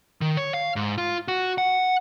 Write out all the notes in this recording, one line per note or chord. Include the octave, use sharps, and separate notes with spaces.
D#3
C#5
F5
G#2
F4
F#4
F#5